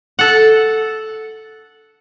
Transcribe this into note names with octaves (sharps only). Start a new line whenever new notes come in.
A4 F#5